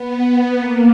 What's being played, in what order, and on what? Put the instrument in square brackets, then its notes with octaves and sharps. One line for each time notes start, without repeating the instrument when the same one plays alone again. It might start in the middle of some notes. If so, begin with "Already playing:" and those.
Already playing: [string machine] B3
A#3